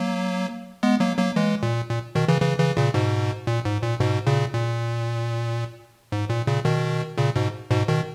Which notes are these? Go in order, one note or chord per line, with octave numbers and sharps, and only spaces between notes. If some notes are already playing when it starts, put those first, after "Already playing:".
Already playing: F#3 A#3
G#3 B3
F#3 A#3
F#3 A#3
E3 G#3
A#2
A#2
B2 D#3
C#3 E3
C#3 E3
C#3 E3
A#2 C#3
G#2 B2
A#2
G#2
A#2
G#2 B2
A#2 C#3
A#2
G#2
A#2
A#2 C#3
B2 D#3
A#2 C#3
G#2 B2
G#2 B2
B2 D#3